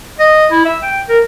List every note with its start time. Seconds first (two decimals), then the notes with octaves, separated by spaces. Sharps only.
0.19 D#5
0.51 E4
0.65 E5
0.82 G5
1.09 A#4